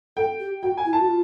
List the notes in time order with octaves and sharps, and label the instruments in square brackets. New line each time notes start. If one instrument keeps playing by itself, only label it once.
[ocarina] A4 [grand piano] G5
[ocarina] G4
[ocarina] F#4 [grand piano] G5
[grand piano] G#5
[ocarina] E4
[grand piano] A5
[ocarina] F#4
F4